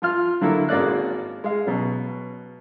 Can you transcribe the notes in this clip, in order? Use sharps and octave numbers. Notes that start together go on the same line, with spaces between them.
F3 F4 F6
D3 F#3 A#3 E4 A4
G#1 G#3 A#3 C#4 D5 F#6
G#3 F5
B2 F#3 C#4